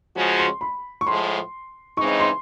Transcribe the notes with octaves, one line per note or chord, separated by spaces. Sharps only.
C#3 F3 G#3 C#4 F#4
C6
B5
C#6
A2 F3 G#3 C6
C#3 E3 G#3 C4 D#4 C#6
C6